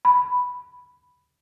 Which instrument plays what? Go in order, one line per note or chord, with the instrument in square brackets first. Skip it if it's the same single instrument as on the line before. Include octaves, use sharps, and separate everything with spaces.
[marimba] B5